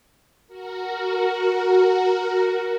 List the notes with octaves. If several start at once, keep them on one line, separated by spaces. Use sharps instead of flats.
F#4 A#4